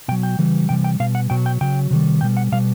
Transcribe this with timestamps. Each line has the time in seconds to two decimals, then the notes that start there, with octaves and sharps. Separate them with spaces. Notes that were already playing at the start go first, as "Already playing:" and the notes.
0.08 B2 G5
0.12 F#3
0.23 G5
0.39 C#3 E3 G3
0.69 C3 E3 G3 G5
0.84 G5
1.00 B2 G3 F5
1.15 F#5
1.30 B2 F#3 G5
1.46 G5
1.61 C#3 F#3 G5
1.91 C3 D#3 G3
2.21 B2 G3 G5
2.37 F#5
2.52 B2 G3 F5